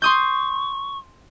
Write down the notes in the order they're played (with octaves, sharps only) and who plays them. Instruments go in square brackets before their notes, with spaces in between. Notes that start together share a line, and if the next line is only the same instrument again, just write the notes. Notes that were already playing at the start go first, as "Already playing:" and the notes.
[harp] C6 D#6 G6 [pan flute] C#6